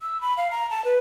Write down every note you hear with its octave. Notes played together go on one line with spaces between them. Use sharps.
E6
B5
F5
A#5
A5
B4